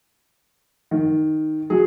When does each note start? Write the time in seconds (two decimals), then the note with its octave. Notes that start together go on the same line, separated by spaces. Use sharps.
0.91 D#3
1.70 F#3 G#4